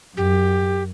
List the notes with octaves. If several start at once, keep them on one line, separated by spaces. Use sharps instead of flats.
F#2 G4